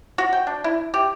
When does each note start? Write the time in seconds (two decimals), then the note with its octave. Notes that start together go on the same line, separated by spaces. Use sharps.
0.18 F#4
0.33 G5
0.47 D4
0.64 E4
0.94 G4